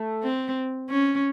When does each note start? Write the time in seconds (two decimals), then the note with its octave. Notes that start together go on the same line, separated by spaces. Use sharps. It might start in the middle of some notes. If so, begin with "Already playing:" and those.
Already playing: A3
0.24 C4
0.90 C#4